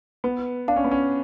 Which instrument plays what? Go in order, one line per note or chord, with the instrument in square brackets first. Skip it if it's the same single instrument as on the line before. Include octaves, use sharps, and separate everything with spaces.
[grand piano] B3 [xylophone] B4
[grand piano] D4 [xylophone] F5 A5
[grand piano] C#4
B3
C#4